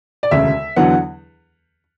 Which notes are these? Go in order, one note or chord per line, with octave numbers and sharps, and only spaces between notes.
D5
E1 D2 C#3 E5
E2 D3 F#3 B3 F#5